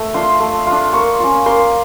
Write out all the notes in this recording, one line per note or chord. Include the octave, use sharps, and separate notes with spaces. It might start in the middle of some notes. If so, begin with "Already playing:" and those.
Already playing: A3
D4 F4 C6
A3
D4 F4
A#3 C#6
C#4 F4
A#3 C6